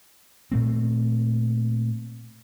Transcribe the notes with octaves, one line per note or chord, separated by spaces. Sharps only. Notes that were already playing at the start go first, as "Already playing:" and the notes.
A#2 A3 C4